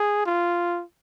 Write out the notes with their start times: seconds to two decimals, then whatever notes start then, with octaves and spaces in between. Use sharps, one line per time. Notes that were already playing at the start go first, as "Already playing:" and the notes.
Already playing: G#4
0.26 F4